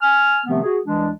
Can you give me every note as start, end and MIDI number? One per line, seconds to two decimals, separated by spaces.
0.01 0.39 80
0.01 0.39 89
0.46 0.61 48
0.46 0.61 51
0.46 0.61 53
0.46 0.61 57
0.46 0.61 59
0.46 0.61 60
0.63 0.78 66
0.63 0.78 68
0.85 1.11 36
0.85 1.11 52
0.85 1.11 56
0.85 1.11 62